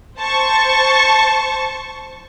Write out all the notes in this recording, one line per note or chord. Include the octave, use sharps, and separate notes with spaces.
C5 A5 C#6